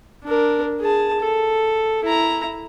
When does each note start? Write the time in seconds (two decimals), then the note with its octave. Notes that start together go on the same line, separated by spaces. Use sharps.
0.24 D4 A#4
0.80 G#4 A5
1.20 A4
2.04 E4 A#5